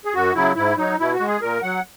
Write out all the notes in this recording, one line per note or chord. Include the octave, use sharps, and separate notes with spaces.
G#4
F#2 F#4
C#3 F#3 E4
G#2 E4
F#3 D#4
B2 E4
F#4
G#3
G#4
A#2 A#4
F#3 F#5